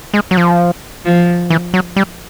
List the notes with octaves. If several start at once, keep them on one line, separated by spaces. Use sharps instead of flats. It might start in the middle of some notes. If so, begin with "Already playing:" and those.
G#3
F#3
F3
F3
E3
F#3
G3